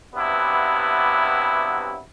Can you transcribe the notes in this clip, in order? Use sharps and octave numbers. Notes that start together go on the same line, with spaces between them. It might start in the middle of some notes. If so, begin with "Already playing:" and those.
G2 C3 F#3 B3 E4